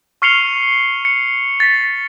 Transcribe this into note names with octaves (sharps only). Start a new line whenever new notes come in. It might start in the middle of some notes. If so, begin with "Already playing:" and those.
C#6 F6 C7 C#7 F7 G7
C#7
A6 B6